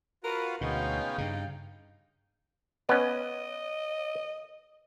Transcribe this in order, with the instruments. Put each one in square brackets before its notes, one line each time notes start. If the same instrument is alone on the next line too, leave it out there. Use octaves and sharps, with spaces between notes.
[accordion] F4 F#4 B4 [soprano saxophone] A#4
[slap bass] D2 B2 [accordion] G#3 B3 C#4 [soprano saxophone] D#4 [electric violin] F5 G5
[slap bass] G2 C#3 [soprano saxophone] D#4
[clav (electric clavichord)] B3 C#4 [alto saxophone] D#5